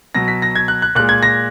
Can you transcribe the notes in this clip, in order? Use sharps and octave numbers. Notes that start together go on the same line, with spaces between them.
B2 F#3 A#6
B6
A#6
G#6
F#6
F#6
A#2 G#3 F#6
G#6
A#6